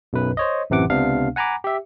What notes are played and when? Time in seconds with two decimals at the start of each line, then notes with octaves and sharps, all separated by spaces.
0.13 B1 F#2 B4
0.37 C5 C#5 D#5
0.70 A1 F#2 C3 E3 F#5 D6
0.90 C#2 C3 B3 D4 F5
1.36 F#5 G#5 A#5 B5 D6
1.64 G4 E5